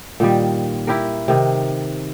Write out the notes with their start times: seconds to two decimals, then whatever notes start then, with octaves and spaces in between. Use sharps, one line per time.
0.20 A#2 D#3 G3
0.87 E4 G4 A#4
1.28 C3 D#3